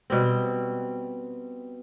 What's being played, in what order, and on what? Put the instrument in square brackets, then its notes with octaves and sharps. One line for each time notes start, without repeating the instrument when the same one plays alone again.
[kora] B2 G3 C4